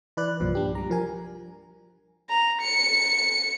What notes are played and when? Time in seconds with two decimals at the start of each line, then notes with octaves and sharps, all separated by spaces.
0.17 E3 B4 D5 F#6
0.40 C2 G2 A#2 F3
0.55 D4 G4
0.75 G3 A#5
0.90 F3 A#4 G#5
2.29 A#5
2.61 C#7